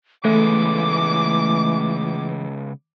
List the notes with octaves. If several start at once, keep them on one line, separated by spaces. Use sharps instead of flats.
C#3 E3 G#3 A3 B3 D6